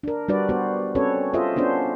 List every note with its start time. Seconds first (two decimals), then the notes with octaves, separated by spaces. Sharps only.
0.03 D4 A#4
0.28 G3 D4 F#4 B4 D5
0.49 B3 F#4 C5
0.95 C4 C#4 F#4 A4 B4 C#5
1.34 F4 G#4 A4 C5 D#5 E5
1.56 B3 C#4 D4 C5